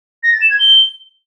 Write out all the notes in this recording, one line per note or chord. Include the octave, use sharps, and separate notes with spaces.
A#6
A6
E7
G#6
G7